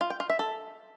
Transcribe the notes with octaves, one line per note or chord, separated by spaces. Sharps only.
F4
G5
F4
E5
A4